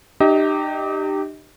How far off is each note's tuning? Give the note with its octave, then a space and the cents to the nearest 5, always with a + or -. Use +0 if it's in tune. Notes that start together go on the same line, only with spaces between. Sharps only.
D#4 -40 G4 -5 D#5 +35